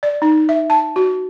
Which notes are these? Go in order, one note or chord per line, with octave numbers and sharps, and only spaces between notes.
D5
D#4
E5
A5
F#4